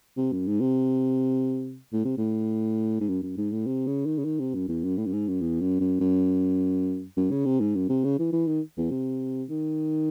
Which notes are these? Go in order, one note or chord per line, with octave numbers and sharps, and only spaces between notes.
C3
F#2
G#2
C3
A2
C3
A2
G#2
F#2
F#2
G#2
A2
C3
C#3
D#3
C#3
D#3
C3
F#2
E2
F#2
A2
F#2
G#2
F#2
E2
F#2
F#2
F#2
F#2
C#3
C3
G#2
F#2
C3
C#3
E3
E3
D#3
E2
C3
D#3